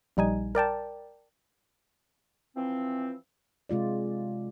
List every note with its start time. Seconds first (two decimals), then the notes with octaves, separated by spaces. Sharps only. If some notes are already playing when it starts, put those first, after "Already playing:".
0.17 A#1 G3 D#4 G#5
0.55 A#4 D5 G5 A5
2.56 E3 F3 C4
3.69 C3 G#3 F4 D5